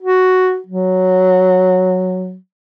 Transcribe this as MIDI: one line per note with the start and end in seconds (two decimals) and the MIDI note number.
0.03 0.58 66
0.67 2.36 54